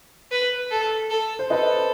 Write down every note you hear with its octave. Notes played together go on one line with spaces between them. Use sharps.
B4
A4
A4
C5
A4 B4 D#5